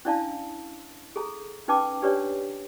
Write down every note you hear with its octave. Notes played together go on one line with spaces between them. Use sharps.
C#4 D4 E4 D5 F5 A5
G#4 A4 A#5
C#4 D#4 B4 G5 A5 D6
D4 G4 B4 C#5 D5